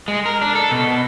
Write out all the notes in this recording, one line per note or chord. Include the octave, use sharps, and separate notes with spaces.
G#3
A#4
D4
A4
B2